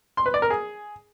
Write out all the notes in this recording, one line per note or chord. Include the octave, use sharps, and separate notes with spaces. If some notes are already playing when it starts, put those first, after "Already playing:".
C6
B4
D5
A#4
G#4